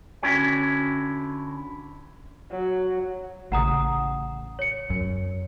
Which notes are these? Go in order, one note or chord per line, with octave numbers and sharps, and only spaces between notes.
D3 C#4 E4 F#4 C#5 G5
F#3
A1 C#3 F#5 A#5 D#6
C#5 C#7
F#2